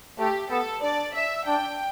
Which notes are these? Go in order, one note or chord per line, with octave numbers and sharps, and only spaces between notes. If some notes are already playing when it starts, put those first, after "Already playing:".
A3 G4
B3 A4
D4 D5
E5
D4 G5